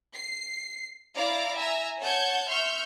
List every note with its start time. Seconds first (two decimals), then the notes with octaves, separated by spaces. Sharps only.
0.14 C7
1.15 E4 D5 F5 A#5 D6
1.57 E5 G#5 A#5 E6
2.00 C#5 F#5 A5 G6 G#6
2.48 E5 C6 C#6 F6 G6